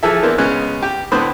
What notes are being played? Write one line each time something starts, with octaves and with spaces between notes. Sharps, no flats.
E3 F3 G#4 A4 E5
E3 A#3 B3 D4 C5
C#3 G#3 B3 C#4 F#6
G4
A2 D3 B3 C5 B5 D#6